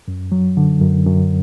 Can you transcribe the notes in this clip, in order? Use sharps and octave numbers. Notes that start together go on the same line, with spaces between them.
F#2
F#3
D3
F#2
F#2